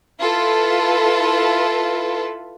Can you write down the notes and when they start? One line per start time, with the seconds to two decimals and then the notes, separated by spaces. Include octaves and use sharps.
0.21 E4 F4 A4 B4